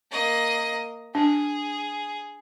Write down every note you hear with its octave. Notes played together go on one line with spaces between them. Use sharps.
A#3 D#5
D4 G#4